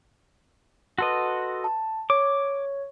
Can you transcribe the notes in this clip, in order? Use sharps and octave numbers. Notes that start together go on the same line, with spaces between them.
F#4 A4 B4 D#5 C6
A5
C#5 D6